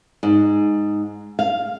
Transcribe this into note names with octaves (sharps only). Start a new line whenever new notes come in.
G#2
F5